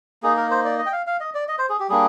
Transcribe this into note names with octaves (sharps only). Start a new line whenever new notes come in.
A#3 D#4 G#4
A#4
C5
D5
D#5
G5
F5
F5
D#5
D5
D#5
C5
G#4
G4
G3 A#3 D4 G#4